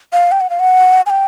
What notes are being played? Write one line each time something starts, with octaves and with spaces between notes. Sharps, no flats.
F5
G5
F#5
F5
F#5
G#5
G5